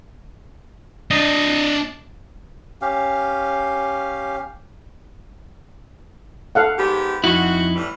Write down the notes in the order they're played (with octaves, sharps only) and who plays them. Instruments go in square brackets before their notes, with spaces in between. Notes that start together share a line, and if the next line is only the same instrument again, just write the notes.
[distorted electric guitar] D4 D#5
[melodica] C#4 G4 F5
[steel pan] A4 F5 F#5
[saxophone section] G#2 B3 G4
[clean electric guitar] F2 D#4 E4 [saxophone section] F#4
[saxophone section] A2 E3 G3